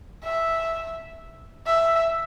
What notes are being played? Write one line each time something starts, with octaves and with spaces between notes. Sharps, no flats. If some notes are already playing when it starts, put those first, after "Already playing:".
E5
E5